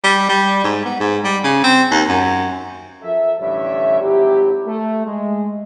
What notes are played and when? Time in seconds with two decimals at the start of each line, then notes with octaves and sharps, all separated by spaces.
0.04 G3
0.29 G3
0.64 G#2
0.85 B3
1.00 G#2
1.24 G3
1.44 C#3
1.64 C4
1.91 D#2
2.08 F#2
3.03 F3 A4 A#4 E5
3.40 A1 G2 D3 G3 C#5 E5
4.01 G#1 F#3 E4 G4
4.67 A3
5.06 G#3